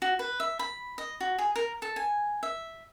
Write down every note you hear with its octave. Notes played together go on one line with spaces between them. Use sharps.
F#4
B4
E5
B5
D#5
F#4
G#4
A#4
A4
G#5
E5